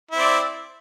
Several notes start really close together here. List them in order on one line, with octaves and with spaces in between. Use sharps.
E4 C4 D5